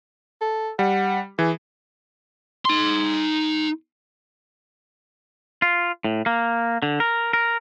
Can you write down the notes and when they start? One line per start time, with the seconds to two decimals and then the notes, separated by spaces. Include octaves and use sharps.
0.41 A4
0.79 G3 F#5
1.39 E3 G#4
2.65 D#4 C6
5.62 F4
6.04 A2
6.26 A#3
6.82 D3
7.00 A#4
7.33 A#4